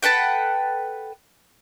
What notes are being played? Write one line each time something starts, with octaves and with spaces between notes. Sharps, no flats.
A4 B4 F#5 G5